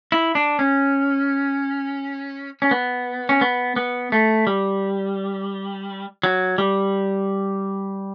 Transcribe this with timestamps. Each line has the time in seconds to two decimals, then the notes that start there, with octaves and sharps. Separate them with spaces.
0.12 E4
0.35 D4
0.59 C#4
2.62 C#4
2.71 B3
3.29 C#4
3.41 B3
3.76 B3
4.12 A3
4.47 G3
6.23 F#3
6.58 G3